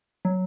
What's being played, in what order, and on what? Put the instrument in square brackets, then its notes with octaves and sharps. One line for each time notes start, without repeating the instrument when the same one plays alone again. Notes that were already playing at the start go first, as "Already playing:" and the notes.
[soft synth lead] F#3